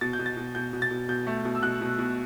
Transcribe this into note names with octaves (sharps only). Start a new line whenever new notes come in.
B2 A6
G6
B2
A6
B2
B2 G6
B2
A6
B2
B2 G6
A3
B2
E6
B2 F#6
B2
B2